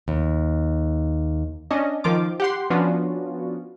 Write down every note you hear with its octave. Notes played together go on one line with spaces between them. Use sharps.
D#2
C#4 D4 D#5
D#3 F3 F4 D6
G4 F#5 C6
F3 B3 C#4 D4 F4 F#4